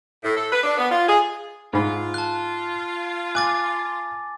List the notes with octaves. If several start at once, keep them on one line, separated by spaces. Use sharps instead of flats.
A2
A4
B4
D4
B3
F4
G#4
G#2 F4 B5
A5 F#6
G#5 D6 F#6 A6